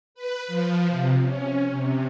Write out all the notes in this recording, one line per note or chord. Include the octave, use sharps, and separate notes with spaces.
B4
F3
C3
C#4
C3